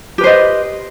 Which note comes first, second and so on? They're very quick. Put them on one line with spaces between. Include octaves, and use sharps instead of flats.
G4 B4 C5 D#5